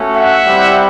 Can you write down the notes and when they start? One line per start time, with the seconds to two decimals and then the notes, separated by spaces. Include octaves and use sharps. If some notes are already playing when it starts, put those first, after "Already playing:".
Already playing: A3 C#4 F#4
0.15 E5 F#5
0.45 G3 C4 E4 G4